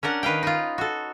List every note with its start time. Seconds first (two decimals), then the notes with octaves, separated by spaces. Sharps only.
0.03 C#4 D4 A#4 F#5
0.23 D#3 B4 F5 G5
0.43 D#4 F4
0.78 F#4 A4